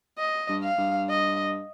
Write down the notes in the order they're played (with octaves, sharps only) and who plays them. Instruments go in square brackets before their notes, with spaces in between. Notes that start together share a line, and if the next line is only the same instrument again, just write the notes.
[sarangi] D#5
[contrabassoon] G2
[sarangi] F5
[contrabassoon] G2
[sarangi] D#5